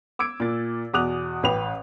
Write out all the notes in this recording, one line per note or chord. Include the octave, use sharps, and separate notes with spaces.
D6 E6 G#6 D7
A#2 A6
E2 B2 D6 D#6 F#6 F7
A1 B4 G5 F7